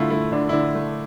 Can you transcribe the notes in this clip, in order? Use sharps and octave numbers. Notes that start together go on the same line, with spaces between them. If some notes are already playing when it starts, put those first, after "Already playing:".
Already playing: D3 A3 E4 F4
A3 E4
D3 D4
E4
D3 D4
A3